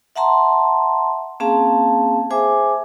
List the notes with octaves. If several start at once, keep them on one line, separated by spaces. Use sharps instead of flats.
E5 F#5 A5 A#5 C6
A#3 C4 C#4 G#4 F5 A5
G#4 C5 E5 G#5 D6